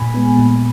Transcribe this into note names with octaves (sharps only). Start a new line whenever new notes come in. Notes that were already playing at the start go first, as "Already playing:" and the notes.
Already playing: A#2 G#5 B5
G#3 B3
A#2